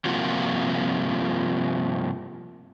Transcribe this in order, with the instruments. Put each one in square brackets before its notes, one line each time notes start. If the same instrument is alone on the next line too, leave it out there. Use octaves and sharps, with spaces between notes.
[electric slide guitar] G2 C3 F3 A#3 F4 F#4